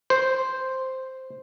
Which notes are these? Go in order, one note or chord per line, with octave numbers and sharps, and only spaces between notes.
C5